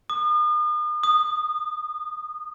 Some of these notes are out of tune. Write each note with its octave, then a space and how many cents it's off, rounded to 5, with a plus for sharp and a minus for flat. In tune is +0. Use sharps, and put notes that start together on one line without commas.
D#6 -40
D#6 -15